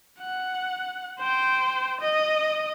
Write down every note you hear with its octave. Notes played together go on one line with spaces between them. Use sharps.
F#5
C5 G5
D#5 D#6